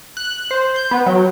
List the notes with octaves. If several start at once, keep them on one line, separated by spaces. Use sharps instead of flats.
F#6
C5
G6
B3
F#3